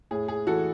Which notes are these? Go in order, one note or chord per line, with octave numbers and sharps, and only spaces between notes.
A2 G#4
G#4
E3 F#4 A4